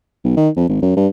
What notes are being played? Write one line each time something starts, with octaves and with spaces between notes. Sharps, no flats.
B1
D#3
F2
G#1
F#2
G2